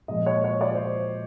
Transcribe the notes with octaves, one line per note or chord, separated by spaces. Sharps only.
A#2 F3 G#3 D#5
C#5
C#5
D5
C5